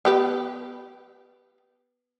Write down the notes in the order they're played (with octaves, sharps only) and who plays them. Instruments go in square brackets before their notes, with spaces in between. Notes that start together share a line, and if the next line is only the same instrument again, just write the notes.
[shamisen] B3 G4 B4